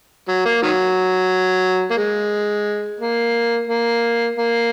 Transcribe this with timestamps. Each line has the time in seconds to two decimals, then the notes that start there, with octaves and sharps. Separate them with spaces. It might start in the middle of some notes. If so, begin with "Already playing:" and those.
0.28 F#3
0.45 A#3
0.62 D#3 F#3
1.91 A#3
1.97 G#3
3.00 A#3
3.67 A#3
4.35 A#3